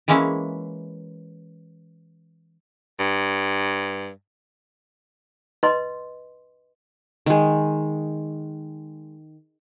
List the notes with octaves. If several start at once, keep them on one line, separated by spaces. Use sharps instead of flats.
E3 G#3 A#3 C#4 E4
G2
B4 D#5 C6
D#3 G#3